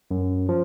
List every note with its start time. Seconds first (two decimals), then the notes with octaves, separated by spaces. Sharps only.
0.11 F#2
0.49 F3